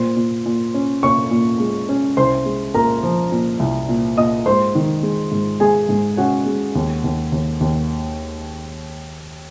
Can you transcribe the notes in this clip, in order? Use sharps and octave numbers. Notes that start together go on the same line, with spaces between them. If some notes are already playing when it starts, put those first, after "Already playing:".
Already playing: A#2 C5 C6
A#2
A#2
C#4
A#2 C#5 C#6
A#2
G#3
C#4
C2 C5 C6
G#3
A#2 A#4 A#5
F3
A#2
C2
A#2
A#2 D#5 D#6
G#2 C5 C6
D#3
G#3
G#2
G#3 G#4 G#5
G#2
C#4 F#4 F#5
G#3
D#2
D#2
D#2
D#2